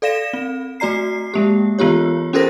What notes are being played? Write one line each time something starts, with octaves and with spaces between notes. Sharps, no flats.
A4 D5 F5 A#6 E7
C4
A3 F#4 D5 A#5 C7
G#3 A#3 G4
E3 B3 F4 G4 C#5
C#4 G4 A4 A#4 C5 A#6